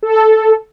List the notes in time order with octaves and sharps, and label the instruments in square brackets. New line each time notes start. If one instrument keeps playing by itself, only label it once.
[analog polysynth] A4